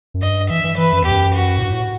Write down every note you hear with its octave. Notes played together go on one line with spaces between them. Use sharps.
F#2
G2 D#5
E3 E5
E3
E3 B4
F#2
E2 G4
F#2
F#4
A2
G2
A2